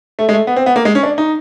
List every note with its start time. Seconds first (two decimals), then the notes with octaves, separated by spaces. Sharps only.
0.19 A3
0.29 G#3
0.33 A3
0.47 B3
0.56 C4
0.66 B3
0.76 A#3
0.85 G#3
0.95 C#4
1.03 D4
1.18 D#4